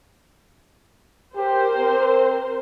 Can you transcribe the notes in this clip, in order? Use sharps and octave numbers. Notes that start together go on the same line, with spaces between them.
G4 A#4 C5
C4